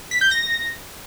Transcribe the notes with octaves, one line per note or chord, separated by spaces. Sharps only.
B6
G6
A#6